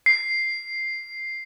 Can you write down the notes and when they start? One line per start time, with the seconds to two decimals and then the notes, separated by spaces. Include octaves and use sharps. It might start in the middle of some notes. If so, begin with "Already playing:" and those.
0.06 C7